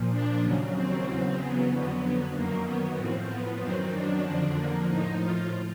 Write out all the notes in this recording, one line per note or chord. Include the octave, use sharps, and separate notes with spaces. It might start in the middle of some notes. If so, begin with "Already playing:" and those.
Already playing: A#2 F3
D4
D#2 C#3 F#3
C4
E2 C#3 F#3
B3
F2 D3 F#3
F#2 D#3 F#3 A#3
B3
A2 F3 C4
B3
F#2 D#3 F#3 C4
D4
F2 D3 F3 D4
A#3
A2 F3 D#4
F4